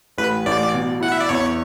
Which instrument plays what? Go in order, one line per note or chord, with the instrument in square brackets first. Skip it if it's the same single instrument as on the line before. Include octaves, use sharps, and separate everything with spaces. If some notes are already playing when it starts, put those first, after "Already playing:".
[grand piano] A1 [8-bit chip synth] B4
[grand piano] A1 [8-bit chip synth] D5
[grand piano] B2
[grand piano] E4 [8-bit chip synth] F#5
[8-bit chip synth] E5
D5
[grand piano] E2 [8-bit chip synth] C#5